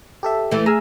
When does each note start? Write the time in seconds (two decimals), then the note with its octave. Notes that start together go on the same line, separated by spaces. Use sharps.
0.23 G4 A4 E5
0.51 E3 A3
0.66 G#4 A#5 E6 F6